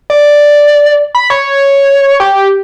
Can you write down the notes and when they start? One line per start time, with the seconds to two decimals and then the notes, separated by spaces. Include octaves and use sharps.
0.10 D5
1.15 B5
1.30 C#5
2.20 G4